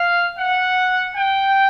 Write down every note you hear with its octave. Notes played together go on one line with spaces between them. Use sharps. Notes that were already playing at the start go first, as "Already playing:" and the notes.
Already playing: F5
F#5
G5